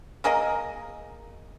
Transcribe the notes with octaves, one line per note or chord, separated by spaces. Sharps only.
A#3 G#4 A#4 D#5